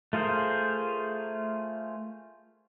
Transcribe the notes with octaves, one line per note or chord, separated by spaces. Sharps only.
A3 F4 G#4 A#4 C5